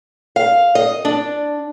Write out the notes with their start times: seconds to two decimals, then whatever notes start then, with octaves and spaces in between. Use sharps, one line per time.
0.36 F5
0.75 D#5
1.05 D4